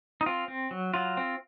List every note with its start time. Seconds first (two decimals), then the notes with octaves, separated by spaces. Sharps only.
0.21 D#4
0.26 C4 F4
0.48 C4
0.71 F#3
0.94 F#3 F4
1.17 C4